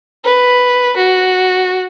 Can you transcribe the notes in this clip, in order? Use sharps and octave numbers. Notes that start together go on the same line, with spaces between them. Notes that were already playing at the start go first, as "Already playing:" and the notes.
B4
F#4